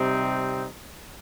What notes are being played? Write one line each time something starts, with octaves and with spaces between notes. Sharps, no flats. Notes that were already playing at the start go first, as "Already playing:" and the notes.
Already playing: C3 G3 C4 D#4